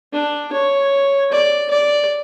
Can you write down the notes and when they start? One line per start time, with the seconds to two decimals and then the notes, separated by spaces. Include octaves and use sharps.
0.13 D4
0.53 C#5
1.32 D5
1.71 D5